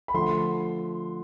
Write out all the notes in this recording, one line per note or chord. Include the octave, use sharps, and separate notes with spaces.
B5
D3 F3 A3 C6